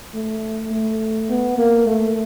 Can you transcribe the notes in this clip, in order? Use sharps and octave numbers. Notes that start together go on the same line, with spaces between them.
A3
A3
B3
A#3
A3